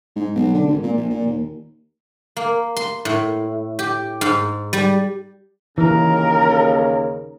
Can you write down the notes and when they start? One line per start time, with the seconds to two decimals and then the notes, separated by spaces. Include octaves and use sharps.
0.16 G#2
0.35 B1
0.53 D3
0.67 G#1
0.82 A#2
0.97 A#1
1.09 A#2
1.26 D#2
2.37 A#3
2.77 C6
3.05 A2
3.79 G4
4.21 G#2
4.73 G3
5.78 D#2 C#3 E3 A#4